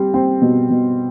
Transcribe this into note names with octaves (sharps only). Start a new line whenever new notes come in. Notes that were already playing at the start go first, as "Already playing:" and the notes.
Already playing: G3 C4
C4
B2
B2